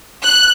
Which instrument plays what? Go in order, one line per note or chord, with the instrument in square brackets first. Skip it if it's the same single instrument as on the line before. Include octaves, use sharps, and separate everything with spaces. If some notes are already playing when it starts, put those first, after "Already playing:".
[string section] F#6